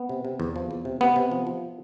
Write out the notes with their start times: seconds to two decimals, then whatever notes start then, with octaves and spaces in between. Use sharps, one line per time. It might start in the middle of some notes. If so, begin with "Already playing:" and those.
Already playing: B3
0.09 C3
0.25 C3
0.40 E2
0.56 F3
0.71 E2
0.85 C3
1.01 C3 B3
1.16 C3
1.31 F3
1.47 F3